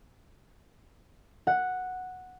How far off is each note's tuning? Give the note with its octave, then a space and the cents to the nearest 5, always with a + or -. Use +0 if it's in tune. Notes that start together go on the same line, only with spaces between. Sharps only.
F#5 -5